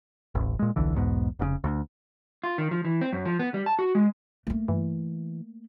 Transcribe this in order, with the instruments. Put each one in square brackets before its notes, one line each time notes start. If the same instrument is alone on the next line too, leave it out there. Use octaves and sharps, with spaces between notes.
[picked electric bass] D#1 A1
A#2 G#3
D#1 B1 D3 E3
B1 E2 G#2 B2
F1 A#2 C#3
D2
[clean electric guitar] F4
D#3
F3
E3
C4
F#2
F3
B3
G3
A5
F#4
G#3
[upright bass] A3 A#3
[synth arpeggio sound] G2 [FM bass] E3